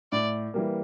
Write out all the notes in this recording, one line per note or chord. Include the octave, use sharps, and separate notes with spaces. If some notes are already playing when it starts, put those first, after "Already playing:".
A2 D5
E3 G3 A#3